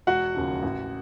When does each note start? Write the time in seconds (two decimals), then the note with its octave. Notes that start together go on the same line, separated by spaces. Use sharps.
0.07 E1 F#4 F#5
0.35 D#2 C#3 F3
0.62 A1